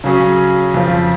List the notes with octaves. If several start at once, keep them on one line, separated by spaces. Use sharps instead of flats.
C#3 F#3 C#4 G#4
F2 C#3 F3